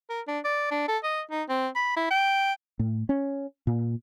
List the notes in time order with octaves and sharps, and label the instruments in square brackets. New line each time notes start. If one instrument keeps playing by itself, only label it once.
[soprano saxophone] A#4
D4
D5
D4
A4
D#5
D#4
C4
B5
E4
G5
[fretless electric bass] A2
C#4
A#2